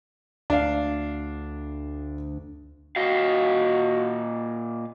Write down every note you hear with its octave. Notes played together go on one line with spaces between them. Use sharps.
D2 D4 F5
A#2 F#4 D#5 F5